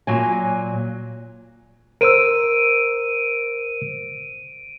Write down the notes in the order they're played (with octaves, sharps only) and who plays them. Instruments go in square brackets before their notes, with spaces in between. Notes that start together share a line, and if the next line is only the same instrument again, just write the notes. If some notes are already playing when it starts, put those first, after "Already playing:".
[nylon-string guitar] A#2 F#3 G#5
[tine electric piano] A#4 C5 E6 [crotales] D7 D#7